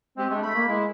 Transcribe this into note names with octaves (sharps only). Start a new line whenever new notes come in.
G#3 C4 G4
G#3 A3 D4 G4
A3 B5
A#3
G#3 E4